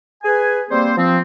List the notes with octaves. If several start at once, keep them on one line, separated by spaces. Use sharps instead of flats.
G#4 B4 G#5
G3 A#3 C4 C5
F3 C4